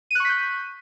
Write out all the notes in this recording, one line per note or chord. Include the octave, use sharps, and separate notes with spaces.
C#6 F#6 G6 B6 D#7